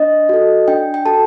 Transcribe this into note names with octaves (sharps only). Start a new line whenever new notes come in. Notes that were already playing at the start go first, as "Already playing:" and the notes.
Already playing: D4 D#5
F#4 A4
D4 G5
G5
F#4 A4 A5